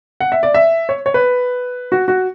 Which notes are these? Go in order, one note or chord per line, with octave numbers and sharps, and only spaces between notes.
F#5
E5
D5
E5
C#5
C#5
B4
F#4
F#4